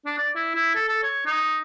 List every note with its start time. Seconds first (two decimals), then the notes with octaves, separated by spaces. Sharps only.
0.06 D4
0.18 D5
0.36 E4
0.55 E4
0.75 A4
0.88 A4
1.03 C#5
1.26 D#4